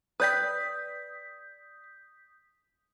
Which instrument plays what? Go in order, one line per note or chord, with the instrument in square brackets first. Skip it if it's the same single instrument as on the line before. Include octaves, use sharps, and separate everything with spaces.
[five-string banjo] B4 D5 G5 [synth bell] D#6 G6 B6